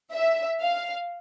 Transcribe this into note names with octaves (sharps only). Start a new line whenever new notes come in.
E5
F5